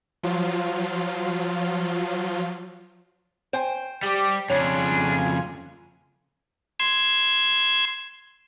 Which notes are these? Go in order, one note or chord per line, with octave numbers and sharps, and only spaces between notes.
F3 F#3 F4
C5 G5 G#5
G3 G4
F2 C#3 D4 F4 C#5 G#5
C6 E6 G#6